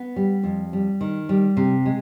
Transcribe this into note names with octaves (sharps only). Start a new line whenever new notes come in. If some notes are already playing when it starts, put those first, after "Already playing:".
Already playing: B3
G3
F2
G3
D#3
G3
C3
G#3